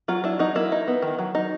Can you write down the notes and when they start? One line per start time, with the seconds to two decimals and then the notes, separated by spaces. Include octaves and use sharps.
0.08 F#3 F4
0.24 D4 E4
0.39 F#3 D#4
0.55 A#3 E4
0.72 D#4
0.87 B3
1.02 D#3
1.19 F#3
1.35 D#4